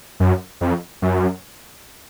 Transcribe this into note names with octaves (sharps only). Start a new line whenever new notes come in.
F#2
F2
F#2